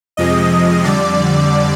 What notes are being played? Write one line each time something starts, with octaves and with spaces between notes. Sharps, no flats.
F2 C3 F3 G#3 D#5
F2 D3 G3 D5